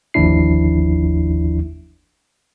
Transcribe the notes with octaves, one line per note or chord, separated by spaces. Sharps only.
G1 D#2 F3 D4 E4 C7